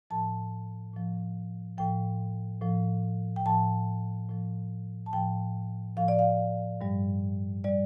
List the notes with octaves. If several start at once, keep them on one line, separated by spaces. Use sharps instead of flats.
A2 F3 A5
A2 F3
A2 F3 G5
A2 F3
G5
A2 F3 A5
A2 F3
A5
A2 F3 G5
A2 F3 F5
D5
F5
G2 G3
G3 D5